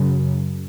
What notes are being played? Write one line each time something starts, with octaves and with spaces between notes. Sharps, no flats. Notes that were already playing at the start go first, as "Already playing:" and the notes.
Already playing: F#2 C#3